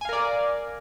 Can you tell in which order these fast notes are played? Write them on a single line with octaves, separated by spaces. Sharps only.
G#5 F5 A#4 D5